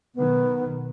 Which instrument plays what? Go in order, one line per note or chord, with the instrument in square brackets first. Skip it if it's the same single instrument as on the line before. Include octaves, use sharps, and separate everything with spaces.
[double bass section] B1 B2 D#3 [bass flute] B3